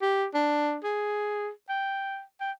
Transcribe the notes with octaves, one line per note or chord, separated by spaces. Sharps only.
G4
D4
G#4
G5
G5